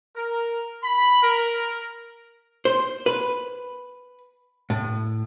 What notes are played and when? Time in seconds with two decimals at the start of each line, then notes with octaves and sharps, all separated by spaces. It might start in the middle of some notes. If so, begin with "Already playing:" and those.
0.16 A#4
0.83 B5
1.23 A#4
2.65 C5
3.06 B4
4.70 A2